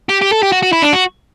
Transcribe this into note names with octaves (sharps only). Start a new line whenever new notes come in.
G4
G4
A4
G4
F#4
F#4
E4
D4
F#4